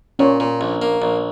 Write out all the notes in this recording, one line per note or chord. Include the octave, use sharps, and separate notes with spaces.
A#2 C#4 C#5
A#2
A#1
A#3
A#1